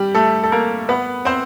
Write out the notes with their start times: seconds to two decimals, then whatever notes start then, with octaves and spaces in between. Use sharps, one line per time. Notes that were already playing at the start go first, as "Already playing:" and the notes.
Already playing: G3 G4
0.15 A3 A4
0.44 A4
0.52 A#3 A#4
0.89 B3 B4
1.25 C4 C5